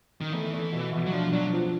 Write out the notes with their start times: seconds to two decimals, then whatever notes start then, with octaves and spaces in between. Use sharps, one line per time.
0.21 D#3
0.33 E3 A3
0.53 A3
0.72 B2
0.93 B2
1.06 F#3
1.13 F3 D4
1.32 F#3 D4
1.53 F3